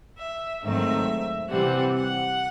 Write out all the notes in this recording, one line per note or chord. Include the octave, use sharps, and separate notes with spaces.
E5
G#2 D#3 F#3 A3 C4 E5
C3 E3 G3 C4 F#5
F#5